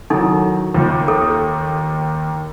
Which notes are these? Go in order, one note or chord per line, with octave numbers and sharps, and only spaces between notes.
D#3 F#3 D#4 E4 A4
D#2 D#3 F4
A4